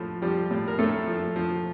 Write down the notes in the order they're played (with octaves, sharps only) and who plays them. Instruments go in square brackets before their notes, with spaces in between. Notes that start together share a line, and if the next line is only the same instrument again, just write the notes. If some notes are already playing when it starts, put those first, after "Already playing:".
Already playing: [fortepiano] A2 F3 A3
F3 G3 G4
A2
A#4
A2 A3 A4
F3
F3